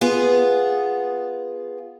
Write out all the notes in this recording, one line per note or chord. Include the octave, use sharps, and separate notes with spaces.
B3 F4 G#4